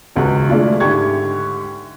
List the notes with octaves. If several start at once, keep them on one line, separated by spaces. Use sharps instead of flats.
D#1 C#2 G#3 F#4
G#3 A3 D4 E4 F4
G#2 D3 E4 G4 C#6 G#6